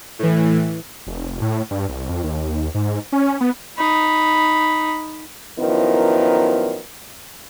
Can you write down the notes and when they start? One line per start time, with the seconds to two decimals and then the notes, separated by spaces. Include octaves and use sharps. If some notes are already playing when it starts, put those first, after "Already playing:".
0.19 A2 E3
1.07 F1
1.42 A2
1.71 G2
1.89 C2
2.09 F2
2.23 D#2
2.75 G#2
3.12 C#4
3.41 B3
3.77 D#4 B5
5.58 F#2 D#3 F3 B3 E4 A#4